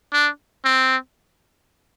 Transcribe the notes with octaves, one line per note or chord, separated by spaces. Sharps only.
D4
C4